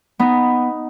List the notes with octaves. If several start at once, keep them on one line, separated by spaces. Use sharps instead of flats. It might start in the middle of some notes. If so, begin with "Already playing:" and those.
B3 D#4